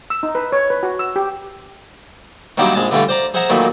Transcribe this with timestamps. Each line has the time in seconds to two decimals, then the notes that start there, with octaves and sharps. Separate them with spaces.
0.10 E6
0.23 D#4
0.35 B4
0.52 C#5
0.70 B4
0.83 F#4
0.99 E6
1.16 G4
2.58 D#3 F#3 G3 A#3 D4 E4
2.75 A#1 G#3 G#5 A5
2.91 D3 E3 G3 A3 F4
3.09 C5 D5 A#5
3.34 G#4 C5 E5 F#5 G#5 A#5
3.49 A#2 D#3 E3 F#3 A3 A#3